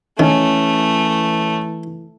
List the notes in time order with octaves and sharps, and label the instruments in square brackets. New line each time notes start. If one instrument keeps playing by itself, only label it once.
[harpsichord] D#3 [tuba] E3 [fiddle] A3 [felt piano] C#4